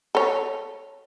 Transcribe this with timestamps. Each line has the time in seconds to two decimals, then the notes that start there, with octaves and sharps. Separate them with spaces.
0.15 A4 C#5